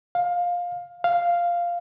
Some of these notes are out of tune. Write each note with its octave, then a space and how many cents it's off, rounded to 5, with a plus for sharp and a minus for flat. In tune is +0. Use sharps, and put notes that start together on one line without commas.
F5 +15
F5 -5